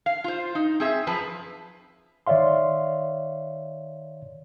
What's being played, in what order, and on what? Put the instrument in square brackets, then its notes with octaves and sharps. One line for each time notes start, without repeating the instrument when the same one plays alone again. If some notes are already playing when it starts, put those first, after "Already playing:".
[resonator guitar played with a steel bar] F5
F4 C5
D#4
C4 G#4 E5
F#2 F3 B4 A5
[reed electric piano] D#3 C#5 D5 E5 F5 C6